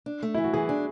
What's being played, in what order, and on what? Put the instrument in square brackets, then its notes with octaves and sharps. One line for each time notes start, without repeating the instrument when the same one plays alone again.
[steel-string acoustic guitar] D4
A3
[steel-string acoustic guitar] E3 [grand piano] E4
[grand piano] F#4
[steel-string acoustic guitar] E3 [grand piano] G#4
[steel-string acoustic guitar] D4